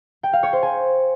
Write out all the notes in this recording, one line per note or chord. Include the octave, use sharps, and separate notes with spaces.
G5
F5
C#5
C5
G#5